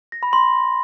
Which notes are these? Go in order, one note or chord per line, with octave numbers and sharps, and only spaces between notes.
A#6
B5
C6